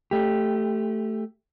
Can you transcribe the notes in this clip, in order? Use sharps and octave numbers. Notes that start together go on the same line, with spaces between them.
A3 G4